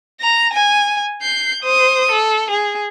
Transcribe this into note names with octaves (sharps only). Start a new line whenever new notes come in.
A#5 A#6
G#5
G6 C7
C5 D#6
A4
G#4